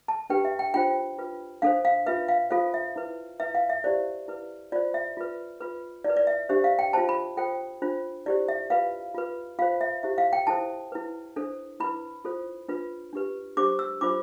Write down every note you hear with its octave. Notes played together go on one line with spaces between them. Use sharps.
A5
D4 G4 B4 G5
E5
G5
D4 F4 C5 G5
F4 B4
D4 A4 C5 F5
F5
F4 B4 E5
F5
F4 A4 C5 F5
E5
E4 B4
E4 B4 E5
F5
E5
E4 G4 C5 D5
E4 B4
F4 C5 D5
E5
F4 B4
F4 B4
E4 B4 D5
D5
E5
D4 G4 C5 E5
F5
G5
F4 C5 A5
B5
F4 A4 C5 G5
D4 F4 C5
E4 G4 C5 D5
E5
F4 B4 F5
F4 B4
F4 C5 F5
E5
E4 G4 C5 E5
F5
G5
E4 A4 C5 A5
E4 B4
D4 A4 C5
E4 B4 B5
F4 A4 C5
D4 F4 B4
D4 G4 B4
D4 G4 C5 D6
E6
D4 F4 C5 D6